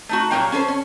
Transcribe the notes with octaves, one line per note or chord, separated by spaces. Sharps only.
A3 D#4 F#4
A#2 F#3 G3 A#3 G5 A#5
C#4 A4 B4 C5
C#4